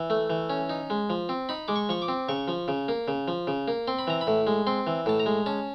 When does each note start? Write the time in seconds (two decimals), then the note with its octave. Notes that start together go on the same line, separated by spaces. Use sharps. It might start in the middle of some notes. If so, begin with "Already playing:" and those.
Already playing: E3
0.10 A3
0.30 E3
0.50 C#4
0.69 D#4
0.90 G#3
1.10 F3
1.29 C4
1.49 D#4 B5
1.68 G#3 D6
1.76 C#6
1.89 F3 C#6
2.02 D6
2.08 C4
2.29 C#3 C#6
2.48 F3
2.68 C#3
2.88 A#3
3.08 C#3
3.28 F3
3.47 C#3
3.68 A#3
3.87 C4 C6
3.99 B5
4.07 E3 A#5
4.21 B5
4.27 A2
4.47 G#3
4.67 C4 C6
4.87 E3
5.06 A2 A5
5.20 A#5
5.26 G#3
5.46 C#4 A5